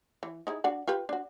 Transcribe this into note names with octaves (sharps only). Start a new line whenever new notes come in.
E3
D#4 E4 G#4
D4 F#4 F#5
F4 G4 B4
D4 F#4